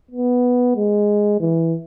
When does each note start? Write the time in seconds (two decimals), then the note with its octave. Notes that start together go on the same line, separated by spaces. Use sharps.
0.11 B3
0.76 G#3
1.40 E3